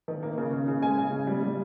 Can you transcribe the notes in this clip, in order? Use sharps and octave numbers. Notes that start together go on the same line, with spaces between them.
D#3
A#3
C#3
C#3
C#3
G#3 G#5
C#3
C#3
G3
G3